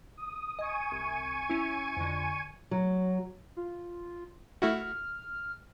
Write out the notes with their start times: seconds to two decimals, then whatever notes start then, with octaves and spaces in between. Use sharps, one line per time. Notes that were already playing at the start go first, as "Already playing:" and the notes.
0.17 D#6
0.59 D#5 G#5 C#6 D#7
0.92 C2
1.50 C#4 E4
1.97 F2 D3
2.71 F#3
3.57 F4
4.62 A3 E4 F#4 F6